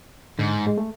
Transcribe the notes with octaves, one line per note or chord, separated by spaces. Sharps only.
G#2 D3
G#3
A3